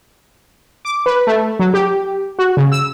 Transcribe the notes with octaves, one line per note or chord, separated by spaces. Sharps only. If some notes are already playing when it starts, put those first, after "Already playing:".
D6
B4
A3
F#3
G4
F#4
C#3
E6